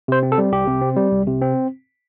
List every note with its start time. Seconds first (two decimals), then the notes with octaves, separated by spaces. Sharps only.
0.08 C3 C5
0.23 C4
0.32 A4
0.38 G3
0.52 C2 G4
0.67 C3
0.82 C4
0.97 G3
1.12 C2
1.27 C3
1.42 C4